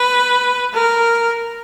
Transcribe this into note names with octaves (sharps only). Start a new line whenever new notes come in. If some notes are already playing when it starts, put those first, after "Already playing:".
Already playing: B4
A#4